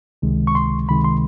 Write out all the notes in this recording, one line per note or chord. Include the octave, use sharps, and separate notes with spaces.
C#2 C3 D#3 G#3
C#6
C6
C#2 C3 D#3 G#3 B5
C6